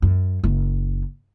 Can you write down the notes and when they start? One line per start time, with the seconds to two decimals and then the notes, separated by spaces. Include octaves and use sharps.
0.02 F#2
0.44 F#1